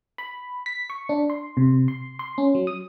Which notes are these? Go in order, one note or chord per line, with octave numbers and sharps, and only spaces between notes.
B5
B6
C#6
D4
C6
C3
C6
C6
C#4
F#3
D#6